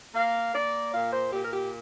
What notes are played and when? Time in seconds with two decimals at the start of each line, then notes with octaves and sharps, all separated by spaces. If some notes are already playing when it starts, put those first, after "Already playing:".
0.15 A#3 F5
0.54 A#3 D5
0.93 A#2 F5
1.13 C5
1.32 A#2 G4
1.44 A#4
1.51 G4